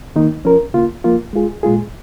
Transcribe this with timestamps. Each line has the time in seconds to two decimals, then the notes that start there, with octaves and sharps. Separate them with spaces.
0.16 D#3 A#3 D#4
0.45 F3 C#4 A#4
0.74 C#3 A#3 F4
1.04 F3 A#3 F4
1.33 G#3 F4 G#4
1.63 A#2 G#3 F4 G#4